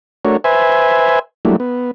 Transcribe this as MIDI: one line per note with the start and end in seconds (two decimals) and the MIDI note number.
0.25 0.37 57
0.25 0.37 62
0.25 0.37 66
0.25 0.37 70
0.25 0.37 73
0.44 1.19 71
0.44 1.19 72
0.44 1.19 76
0.44 1.19 80
1.45 1.56 54
1.45 1.56 55
1.45 1.56 57
1.45 1.56 58
1.45 1.56 62
1.45 1.56 64
1.60 1.91 59